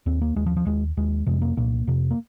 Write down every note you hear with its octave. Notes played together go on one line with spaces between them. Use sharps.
D#2 C4
A#3
D#2 G#3
F3
F3
D#2 G#3
D#2 G#3
F2 C3 G#3
A#3
C2 A#2 A#3
F2 C3
A#3